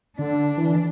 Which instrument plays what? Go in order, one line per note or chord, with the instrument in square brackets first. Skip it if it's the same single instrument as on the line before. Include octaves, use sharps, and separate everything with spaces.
[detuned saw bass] D3 [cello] D4
[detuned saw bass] E3